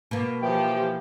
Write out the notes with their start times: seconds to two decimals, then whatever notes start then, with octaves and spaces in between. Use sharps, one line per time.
0.11 B2 A#3
0.43 E3 F3 G4 G5